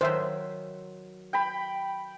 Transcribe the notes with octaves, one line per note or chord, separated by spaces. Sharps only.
D#3 F#3 C5 E5
G5 B5